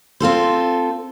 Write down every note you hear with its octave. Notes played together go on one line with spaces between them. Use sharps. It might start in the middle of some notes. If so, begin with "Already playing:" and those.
C4 F4 A4 C5